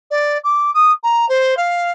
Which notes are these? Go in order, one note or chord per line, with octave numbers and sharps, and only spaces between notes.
D5
D6
D#6
A#5
C5
F5